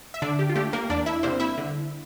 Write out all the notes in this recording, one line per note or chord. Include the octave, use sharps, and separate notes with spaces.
E5
D3 D4 D5
G4
F4
A3 D4 G4
A#3 A#4
E2 D4 D5
E4 E5
C3 G3 A#3 C4 D4 C5
E4 E5
D3